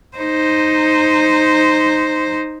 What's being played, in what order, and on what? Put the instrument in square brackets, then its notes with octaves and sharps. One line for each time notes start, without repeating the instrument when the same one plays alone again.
[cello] D#4 C5